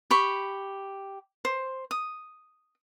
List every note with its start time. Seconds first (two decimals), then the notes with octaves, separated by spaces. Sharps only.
0.11 G4 B5 C#6
1.45 C5
1.91 D#6